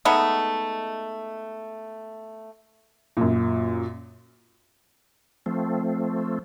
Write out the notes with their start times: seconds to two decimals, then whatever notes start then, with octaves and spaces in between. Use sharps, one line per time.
0.05 G#3 A3 B3 D#4
3.17 F#2 A#2
5.46 F3 A3 C4